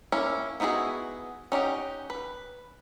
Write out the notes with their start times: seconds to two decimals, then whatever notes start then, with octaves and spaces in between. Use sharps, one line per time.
0.12 A#3 C#4 E4
0.60 B3 D#4 E4 F#4 G#4
1.52 C#4 D#4 G4 F#5
2.10 B4